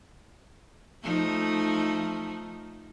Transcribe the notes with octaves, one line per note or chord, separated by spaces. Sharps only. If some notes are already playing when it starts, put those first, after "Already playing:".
F3 A3 D#4